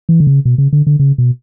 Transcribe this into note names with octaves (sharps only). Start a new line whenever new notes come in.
E3
D3
C#3
B2
C#3
D3
D3
C#3
B2